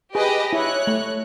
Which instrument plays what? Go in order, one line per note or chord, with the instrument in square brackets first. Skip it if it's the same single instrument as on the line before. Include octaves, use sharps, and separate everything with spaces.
[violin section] G4 B4 D#5 [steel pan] G#4
[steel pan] E4 [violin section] C#5 F#6
[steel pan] A3